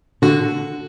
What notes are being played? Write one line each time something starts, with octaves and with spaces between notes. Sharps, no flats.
D3 F#4